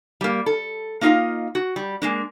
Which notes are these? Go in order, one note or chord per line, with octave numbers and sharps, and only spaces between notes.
G3 A#3
A4
A#3 D#4 F4 D5 D#5 F5
F#4
G3
G#3 A#3 D4